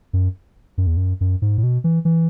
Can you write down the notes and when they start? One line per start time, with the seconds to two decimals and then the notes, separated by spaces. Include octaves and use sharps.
0.13 F#2
0.78 F#2
0.87 E2
0.97 F#2
1.21 F#2
1.42 G#2
1.58 A2
1.63 B2
1.84 E3
2.05 E3